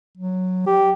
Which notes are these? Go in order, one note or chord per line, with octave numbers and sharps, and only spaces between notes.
F#3
G4